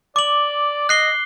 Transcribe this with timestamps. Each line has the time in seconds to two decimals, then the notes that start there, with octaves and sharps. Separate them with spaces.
0.16 D5 D6 F#7
0.89 D#5 F#6 C7 G7